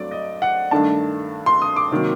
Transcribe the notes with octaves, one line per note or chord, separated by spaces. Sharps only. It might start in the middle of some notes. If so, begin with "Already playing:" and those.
Already playing: G2 F#3 A3 C4 D5
D#5
F#5
G2 D#3 A3 D4 A5
C6
D#6
D6
C3 D#3 F#3 A#3